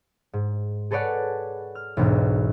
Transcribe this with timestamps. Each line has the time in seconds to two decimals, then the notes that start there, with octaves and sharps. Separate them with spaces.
0.33 G#2
0.91 G#4 A4 B4 C#5 D5 F#5
1.75 F6
1.97 E1 B1 G#2